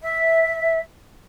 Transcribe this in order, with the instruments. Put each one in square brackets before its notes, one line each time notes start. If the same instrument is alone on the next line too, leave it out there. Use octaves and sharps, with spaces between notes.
[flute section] E5